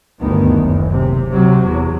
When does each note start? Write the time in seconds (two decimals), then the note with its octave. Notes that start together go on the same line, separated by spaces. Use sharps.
0.21 G1 D2 D#3 B3
0.56 F#1
0.93 C3
1.31 C3 F#3
1.66 E2